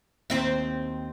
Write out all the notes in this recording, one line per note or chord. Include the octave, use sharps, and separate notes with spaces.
D#2 C4 E5